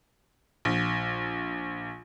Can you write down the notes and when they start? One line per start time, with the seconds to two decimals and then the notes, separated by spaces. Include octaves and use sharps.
0.65 A#1